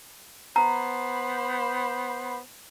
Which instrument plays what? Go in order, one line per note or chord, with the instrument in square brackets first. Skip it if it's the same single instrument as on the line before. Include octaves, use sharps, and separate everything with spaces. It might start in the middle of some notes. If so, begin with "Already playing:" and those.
[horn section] B3 C5 B5 [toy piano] A#5